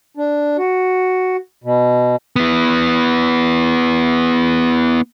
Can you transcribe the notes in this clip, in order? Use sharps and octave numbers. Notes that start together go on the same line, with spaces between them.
D4
F#4
B2
B3 E4